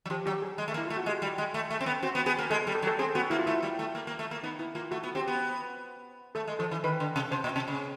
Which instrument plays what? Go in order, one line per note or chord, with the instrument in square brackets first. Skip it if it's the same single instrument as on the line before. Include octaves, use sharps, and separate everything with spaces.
[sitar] F#3
[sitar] F3 [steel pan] G4
[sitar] F#3 [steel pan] G4
[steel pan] G#4
[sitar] G#3
A3
A#3
[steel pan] E4
[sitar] A3 [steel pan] F4
[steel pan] F#4
[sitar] G#3 [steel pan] G4
[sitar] G3
G#3
A3
A3
C4
B3
[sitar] C4 [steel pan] F#4
[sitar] B3
[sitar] B3 [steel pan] G#4
[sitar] A#3
[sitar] G#3 [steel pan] A4
[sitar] G3
[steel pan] A4
[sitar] F#3
[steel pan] A4
[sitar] C4 [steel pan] G#4
[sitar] B3 [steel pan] F#4
[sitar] A#3 [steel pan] E4
[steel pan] F4
[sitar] A3 [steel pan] E4
[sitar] G3
A3
A#3
A#3
A3
A#3
[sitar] B3 [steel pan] D#4
[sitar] B3 [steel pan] E4
[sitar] A#3 [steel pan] F4
[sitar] A3 [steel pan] F#4
[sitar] B3
[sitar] C4 [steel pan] G4
[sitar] B3
[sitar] A3 [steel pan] A4
[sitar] G#3
[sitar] F3 [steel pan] A4
[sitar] E3
[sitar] D#3 [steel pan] B4
[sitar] D3
C3
[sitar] C3 [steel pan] C5
[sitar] A#2
C3
C#3